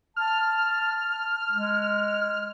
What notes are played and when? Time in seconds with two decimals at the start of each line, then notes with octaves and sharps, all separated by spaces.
0.16 A5 F6
1.52 G#3